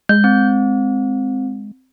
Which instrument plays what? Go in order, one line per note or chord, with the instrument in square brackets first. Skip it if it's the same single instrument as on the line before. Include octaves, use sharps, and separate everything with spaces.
[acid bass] G#3 [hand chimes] G6
[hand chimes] C4